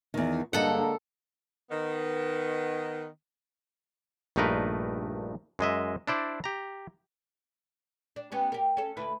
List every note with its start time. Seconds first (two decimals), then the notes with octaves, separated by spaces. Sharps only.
0.14 E2 D#3
0.53 G2 D3 G#3 A#3 A4 D#5 F#5
1.70 D#3 B3
4.36 A#1 G2 A3 D#4 A#4 B4
5.59 F#2 G#3 D#5 E5
6.08 D4 E4 C5 D5
6.44 G4 A#5
8.16 D4
8.32 B3 C#4 G4
8.52 G4 A#4
8.77 C#4 A4
8.97 D2 E4 B4